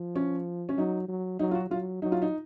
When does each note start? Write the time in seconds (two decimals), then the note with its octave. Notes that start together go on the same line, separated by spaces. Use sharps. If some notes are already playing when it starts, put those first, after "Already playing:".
Already playing: F3
0.15 C#4
0.69 C#4
0.77 F#3 D#4
1.08 F#3
1.39 F#3 D#4
1.51 F4
1.55 F#4
1.70 F#3 F4
2.02 F#3 D#4
2.12 F4
2.22 D#4